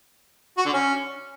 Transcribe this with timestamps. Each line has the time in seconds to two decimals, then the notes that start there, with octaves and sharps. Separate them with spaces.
0.57 F#4
0.65 D3
0.73 C#4